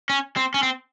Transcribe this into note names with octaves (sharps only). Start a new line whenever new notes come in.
C#4
C4
C#4
C4